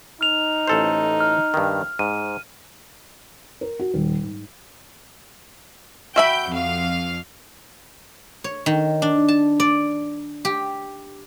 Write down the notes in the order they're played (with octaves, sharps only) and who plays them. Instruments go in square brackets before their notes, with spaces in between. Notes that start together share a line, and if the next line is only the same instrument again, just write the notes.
[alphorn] D#4 [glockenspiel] F6 F7
[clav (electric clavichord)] A1 A4 C5
[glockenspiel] F6
[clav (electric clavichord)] G2 D#3
[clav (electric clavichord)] G#2 [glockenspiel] D#7
[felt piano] A#4
F#4
D#1
G#2
[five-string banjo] F#4 E5 B5 [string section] G5 G6
[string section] F2 F5
[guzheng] C#5
D#3
D4
A5
D5
G4